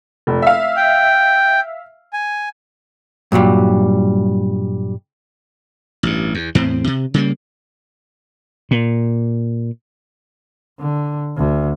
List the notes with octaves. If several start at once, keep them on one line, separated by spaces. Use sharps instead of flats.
F1
E5 F5
G5
G#5
G2 A#2 F#3 G3
A1 G2
E2
E2 A2 C4
C3
C#3 G3 A#3
A#2
D3
D2